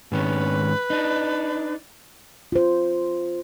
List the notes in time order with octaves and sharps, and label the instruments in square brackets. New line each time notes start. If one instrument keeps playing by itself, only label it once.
[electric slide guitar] G#2 D#3 C#4 [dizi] B4
[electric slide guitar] D4 D#4
[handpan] F4 C5